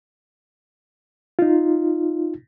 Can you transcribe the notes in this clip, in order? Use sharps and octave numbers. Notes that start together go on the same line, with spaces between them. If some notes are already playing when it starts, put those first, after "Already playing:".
D#4 F4